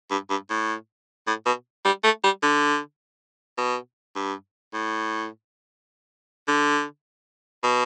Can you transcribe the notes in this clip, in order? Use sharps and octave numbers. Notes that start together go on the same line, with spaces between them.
G2
G2
A2
A2
B2
G3
A3
G3
D3
B2
G2
A2
D3
B2